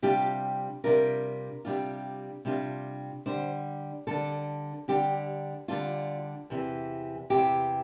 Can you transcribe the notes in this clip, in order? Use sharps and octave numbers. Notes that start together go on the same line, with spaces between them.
C3 G3 D4 F4 G4
C3 G3 D4 F4 A#4
C3 G3 D4 F4
C3 G3 D4 F4
D3 G3 D4 C5
D3 G3 D4 A4
D3 G3 D4 G4
D3 G3 D4 F4
E2 C3 E3
E2 C3 E3 G4